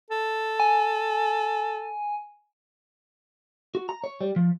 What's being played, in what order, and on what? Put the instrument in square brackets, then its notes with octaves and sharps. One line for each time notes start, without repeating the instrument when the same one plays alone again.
[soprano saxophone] A4
[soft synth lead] G#5
[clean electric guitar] F#4
A#5
C#5
G3
F3